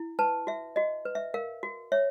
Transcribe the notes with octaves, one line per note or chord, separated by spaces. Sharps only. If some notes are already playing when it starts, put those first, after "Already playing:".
Already playing: E4
B4 A5
F#4 E5
F#4 D#5
B4
E5
A#4 F5
F#4
C#5 E5